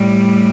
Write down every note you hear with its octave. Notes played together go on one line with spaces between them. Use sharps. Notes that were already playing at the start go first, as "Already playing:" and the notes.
Already playing: A2 G3